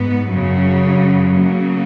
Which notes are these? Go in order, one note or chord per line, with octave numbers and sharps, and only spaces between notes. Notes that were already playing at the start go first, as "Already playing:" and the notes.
Already playing: G#2 B3
F#2 C#3 F#3
C#3 F#3 A#3